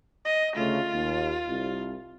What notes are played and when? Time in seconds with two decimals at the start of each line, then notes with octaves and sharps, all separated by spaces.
0.25 D#5
0.55 D2 C#3 A3 F4
0.94 D#2
1.49 C2